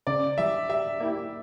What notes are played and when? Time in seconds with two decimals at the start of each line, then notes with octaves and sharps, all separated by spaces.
0.07 C#3 D5
0.38 E3 G3 E5
0.69 G3 E5
1.00 A#3 E4 G4